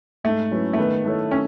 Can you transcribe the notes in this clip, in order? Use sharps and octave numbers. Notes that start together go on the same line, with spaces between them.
G#2 A3
F#3 C#4 E4 B4
A3
D#3 B3
A3 E4 A4 C#5
C#4